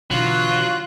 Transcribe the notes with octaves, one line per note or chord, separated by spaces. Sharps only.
B2 D3 E3 F#3 F4 F#6